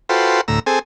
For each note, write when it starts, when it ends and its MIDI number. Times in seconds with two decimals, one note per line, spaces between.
0.09 0.41 65
0.09 0.41 66
0.09 0.41 69
0.09 0.41 71
0.09 0.41 72
0.09 0.41 79
0.48 0.59 38
0.48 0.59 45
0.48 0.59 82
0.48 0.59 88
0.66 0.79 60
0.66 0.79 68
0.66 0.79 69
0.66 0.79 80